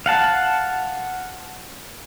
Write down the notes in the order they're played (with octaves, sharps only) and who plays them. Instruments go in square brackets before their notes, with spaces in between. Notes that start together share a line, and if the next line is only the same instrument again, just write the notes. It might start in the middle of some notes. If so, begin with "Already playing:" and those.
[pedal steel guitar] F5 F#5 A5